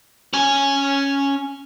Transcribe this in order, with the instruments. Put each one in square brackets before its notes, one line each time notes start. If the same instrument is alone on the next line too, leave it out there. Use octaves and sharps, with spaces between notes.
[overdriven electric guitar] C#4 G#5